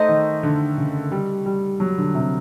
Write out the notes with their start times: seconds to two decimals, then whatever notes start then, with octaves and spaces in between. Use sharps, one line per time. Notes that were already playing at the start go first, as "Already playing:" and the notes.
Already playing: A3 D#4 C5 D#5
0.09 D#3
0.43 D3
0.78 C#3
1.12 G3
1.46 G3
1.80 F#3
1.98 D3
2.15 C3